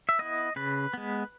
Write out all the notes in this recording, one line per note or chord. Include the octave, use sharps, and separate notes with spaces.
E5
B3 E4 D#5
C#3 B4
G#3 B3